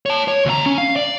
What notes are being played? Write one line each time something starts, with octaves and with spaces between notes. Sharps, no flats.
C#5 A5
C#5
D2 A#5
C#4
F5
D5